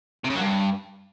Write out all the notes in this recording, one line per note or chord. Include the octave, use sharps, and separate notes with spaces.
C3
C#3
F#3
G2